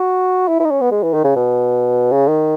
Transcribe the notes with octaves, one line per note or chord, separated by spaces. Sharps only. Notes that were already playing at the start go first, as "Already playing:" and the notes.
Already playing: F#4
E4
E4
D#4
C#4
B3
G#3
E3
D#3
C#3
B2
C#3
D#3